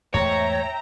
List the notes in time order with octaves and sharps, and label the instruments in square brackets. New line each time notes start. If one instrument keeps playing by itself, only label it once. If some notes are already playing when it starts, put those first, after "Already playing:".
[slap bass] E2 G#2 A3 [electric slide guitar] C#5 [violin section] E5 G5 A#5